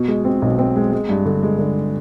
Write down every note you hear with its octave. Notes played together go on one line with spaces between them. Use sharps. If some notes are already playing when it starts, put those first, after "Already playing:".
Already playing: B2
G#3
C4
B1
C4
G#3
G#3
G2
D3
G#3
D3